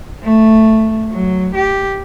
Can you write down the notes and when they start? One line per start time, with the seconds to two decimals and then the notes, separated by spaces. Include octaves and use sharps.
0.23 A3
1.11 F#3
1.55 G4